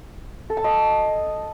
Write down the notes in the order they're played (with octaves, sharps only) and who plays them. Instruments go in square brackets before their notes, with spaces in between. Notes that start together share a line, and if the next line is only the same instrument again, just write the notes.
[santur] A4
A5
D#5